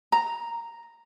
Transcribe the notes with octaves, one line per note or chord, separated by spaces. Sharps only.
A#5